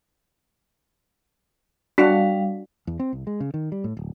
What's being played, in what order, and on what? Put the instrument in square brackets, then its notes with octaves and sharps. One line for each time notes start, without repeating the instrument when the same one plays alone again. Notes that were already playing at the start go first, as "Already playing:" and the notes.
[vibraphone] G3 F5 [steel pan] D4 F#4
[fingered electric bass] E2
C4
C2
G#3
C#3
D#3
G3
A2
D1